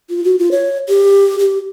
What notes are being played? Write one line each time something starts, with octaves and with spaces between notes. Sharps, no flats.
F4
F#4
F4
C#5
G4
G4